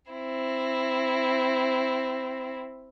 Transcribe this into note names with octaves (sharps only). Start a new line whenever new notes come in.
C4 E4